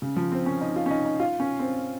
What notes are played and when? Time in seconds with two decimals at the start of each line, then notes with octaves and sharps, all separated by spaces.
0.02 C#3
0.16 F3
0.32 C4
0.46 C#4
0.61 D#4
0.76 F4
0.86 C#4
0.91 D#4
1.05 D#4
1.20 F4
1.40 C#4
1.59 C4